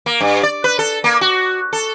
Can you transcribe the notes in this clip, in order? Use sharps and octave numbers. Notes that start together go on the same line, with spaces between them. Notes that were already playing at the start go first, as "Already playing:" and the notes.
A#3
G2
D5
B4
A4
A#3
F#4
A4